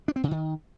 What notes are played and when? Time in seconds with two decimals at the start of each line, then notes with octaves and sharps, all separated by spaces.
0.08 D4
0.16 C4
0.24 C#3
0.31 D#3